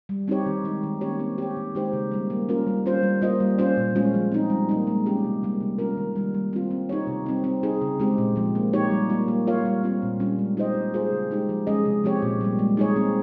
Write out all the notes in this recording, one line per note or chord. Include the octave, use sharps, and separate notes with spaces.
G3
C4 D#4 G4 C#5
D#3
G#3 D#4
D#3
A#3 C#4 G4 C#5
C4
G4 C#5
D#3
G#3 D#4 G4 C5
C#3
G3 A#3
A#3
C#4 F4 A#4
G3
C#4 F4 C5
G3
A#3 F4 C5 D#5
G3
C#4 F4 C5
A#2
G#3 C#4 F4
F3
C4 D#4
G3
A#3 D#4
G#3
C#4 G4
C3
G3 A#3
C3
G3 C#4 F4 A#4
D#3
G3 A#3
G3
C4 F4
C4
D#4 G4 C#5
C3
G3 C4 D#4
C4
D#4 G#4
C#3
G#3 C4 G4
A#2
F3 G#3
A#3
D#4 G4 C#5
G3
A#3 F4
A#3
F4 A#4 C#5 F5
G3
C4 F4
A#2
G3 C#4 F4
G#3
D#4 G4 C5 D#5
A#3
F4 G#4 C5
C#3
G#3 D#4 G4
F3
G#3 C#4 G#4 D#5
C3
F3 C4 G4 C#5
A#2
G3 A#3
G#3
D#4 G#4 C#5
C4